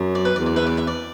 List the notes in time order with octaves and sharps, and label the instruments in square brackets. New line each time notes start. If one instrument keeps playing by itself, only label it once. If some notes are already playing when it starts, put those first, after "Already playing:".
Already playing: [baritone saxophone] F#2
[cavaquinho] D5
B4
[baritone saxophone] E2 [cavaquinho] D5
[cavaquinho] D5
B4 E5
D5
B4 E5
D5